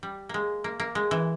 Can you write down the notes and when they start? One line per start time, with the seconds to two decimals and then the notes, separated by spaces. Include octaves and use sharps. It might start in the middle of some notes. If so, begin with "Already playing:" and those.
0.03 G3
0.29 G#3 A#3
0.64 A#3
0.80 A#3
0.95 G#3
1.11 E3